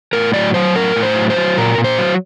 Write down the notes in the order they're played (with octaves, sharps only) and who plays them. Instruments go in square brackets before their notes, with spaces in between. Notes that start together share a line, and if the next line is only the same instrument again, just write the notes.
[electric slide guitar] A2 A#4
F#3 D5
F#3 C5
A2 A#4
A2
C5
F#3
C5
F#3
A#2 A#4
A#2
C5
F#3